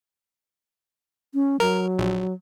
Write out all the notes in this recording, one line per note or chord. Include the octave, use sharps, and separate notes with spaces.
C#4
F#3 A#4
A#1